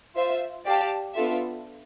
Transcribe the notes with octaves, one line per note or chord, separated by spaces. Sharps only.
F4 C5 E5
G4 D5 F5 A5
B3 D4 F4 A4 E5